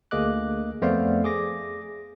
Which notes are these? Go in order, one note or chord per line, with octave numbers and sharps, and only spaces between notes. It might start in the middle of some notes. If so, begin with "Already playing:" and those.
D2 A#3 G#4 D#5 D6 F#6
F2 A3 B3 C5 D5 F5
G#4 D6 A#6